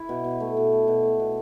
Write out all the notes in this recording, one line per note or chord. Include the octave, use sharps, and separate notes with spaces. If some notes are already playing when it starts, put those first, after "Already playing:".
Already playing: E4
B2
B2
A3
B2
A3
B2
A3
B2